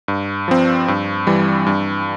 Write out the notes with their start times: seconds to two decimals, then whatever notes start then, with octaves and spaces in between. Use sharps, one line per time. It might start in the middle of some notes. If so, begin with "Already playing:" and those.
0.08 G2
0.48 F3 C4
0.88 G2
1.27 E3 G3
1.66 G2